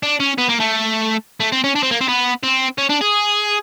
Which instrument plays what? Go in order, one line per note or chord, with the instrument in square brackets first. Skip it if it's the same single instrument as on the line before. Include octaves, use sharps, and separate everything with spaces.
[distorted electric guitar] D4
C#4
B3
A#3
A3
A3
C4
C#4
D4
C4
A#3
C4
B3
C4
C#4
D4
G#4